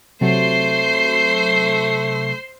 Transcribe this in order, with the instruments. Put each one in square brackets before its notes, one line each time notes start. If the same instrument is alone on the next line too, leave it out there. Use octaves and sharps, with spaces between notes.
[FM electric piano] C3 F#3 [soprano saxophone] A3 [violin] C5 C6